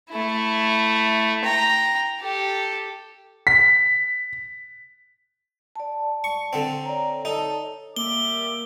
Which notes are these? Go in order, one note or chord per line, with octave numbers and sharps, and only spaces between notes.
A3 E4
G5 A#5
G4 A4
B6
D5 A5
C#6
D3 C4
C#5 D5 A#5
D#4 A4
G3 A#3 E5 D6 G7